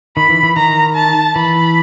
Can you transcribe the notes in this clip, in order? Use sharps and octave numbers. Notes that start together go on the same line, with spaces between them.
D#3 B5
E3
E3
D#3 A#5
A5
E3 B5